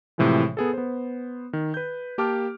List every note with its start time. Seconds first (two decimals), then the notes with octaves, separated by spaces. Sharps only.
0.18 A2 C3 E3 F3 G#3
0.57 B3 G#4 A4
0.73 B3 C5
1.53 D#3
1.74 B4 G6
2.18 A#3 G4 A5 D6 F6